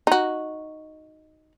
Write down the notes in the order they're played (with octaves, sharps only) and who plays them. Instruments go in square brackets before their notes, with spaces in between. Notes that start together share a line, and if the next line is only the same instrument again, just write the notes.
[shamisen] D#4 F#4